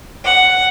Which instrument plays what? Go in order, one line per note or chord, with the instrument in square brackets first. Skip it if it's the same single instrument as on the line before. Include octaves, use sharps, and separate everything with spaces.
[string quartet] F#5